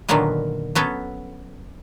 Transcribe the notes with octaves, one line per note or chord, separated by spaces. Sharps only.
A#2 D3 D#3 F#3 A#3 B3
F#3 B3 C#4 A4